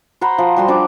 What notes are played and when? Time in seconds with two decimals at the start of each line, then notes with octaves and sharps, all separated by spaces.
0.21 C5 F#5 A#5 B5
0.38 F3
0.56 G3 F#4 C6
0.68 F3 D4 D6